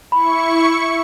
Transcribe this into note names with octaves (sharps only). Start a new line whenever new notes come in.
E4 B5 C#6 C#7